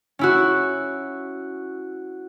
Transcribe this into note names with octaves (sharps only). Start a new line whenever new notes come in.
C#4 E4 F#4